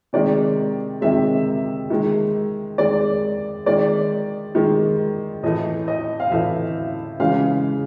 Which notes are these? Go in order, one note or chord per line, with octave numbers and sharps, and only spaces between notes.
C3 D#3 G#3 D5
C3 D#3 G#3 E5
D#3 G#3
D#3 G#3 D5
D#3 G#3 D5
D#3 G#3
A2 E3 A3 D#5
D#5
F5
A2 E3 A3 E5
C#3 E3 G#3 F5